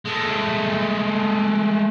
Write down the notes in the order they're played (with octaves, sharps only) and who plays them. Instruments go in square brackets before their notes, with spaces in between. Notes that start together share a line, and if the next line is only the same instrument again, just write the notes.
[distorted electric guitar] G#3 A3